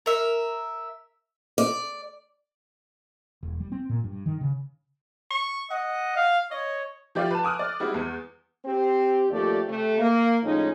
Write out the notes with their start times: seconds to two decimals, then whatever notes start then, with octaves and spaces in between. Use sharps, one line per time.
0.06 A#4 E5
1.58 D5
3.43 E1
3.60 G3
3.72 C4
3.89 A#2
4.04 G2
4.26 D#3
4.41 C#3
5.30 C#6
5.71 D#5 F#5
6.16 F5
6.51 C#5 D#5
7.15 F3 G4 D5 E5 F5
7.30 B4 A5
7.43 G#5 D6 D#6 F6 F#6
7.59 D5
7.80 G3 G#3 C4 E4 F#4
7.94 E2
8.65 C4 G4
9.30 D#2 F3 A3 G4 D5
9.68 C3 A3
9.98 A#3
10.43 A2 F3 G#3 C#4 D#4